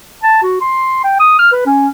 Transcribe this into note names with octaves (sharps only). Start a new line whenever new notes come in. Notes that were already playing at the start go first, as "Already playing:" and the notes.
A5
F#4
C6
G5
D#6
F6
B4
C#4